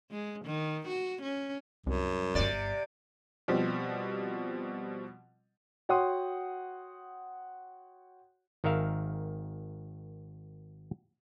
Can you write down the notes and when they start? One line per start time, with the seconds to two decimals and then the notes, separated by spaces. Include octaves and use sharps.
0.11 G#3
0.45 D#3
0.88 F#4
1.23 C#4
1.86 C2 F#2
2.35 G1 G2 C3 D5
3.48 B2 F3 G3 C4
5.89 F#4 C#5 F#5 G5 C6 D#6
8.64 G#1 D#3 A#4 E5 F5